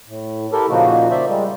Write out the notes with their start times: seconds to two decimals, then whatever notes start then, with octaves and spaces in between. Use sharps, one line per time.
0.08 A2
0.52 E4 G4 A4 A#4
0.69 A#2 C#3 F3 A#3 D#4 F#4
1.10 C5 D5 E5
1.28 G3 G#3